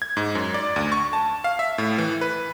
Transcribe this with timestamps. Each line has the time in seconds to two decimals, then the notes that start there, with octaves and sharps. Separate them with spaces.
0.02 G#6
0.17 G#2
0.35 F#2
0.54 D5
0.76 D2
0.92 C#6
1.13 A5
1.44 F5
1.59 E5
1.78 A2
1.98 E3
2.21 B4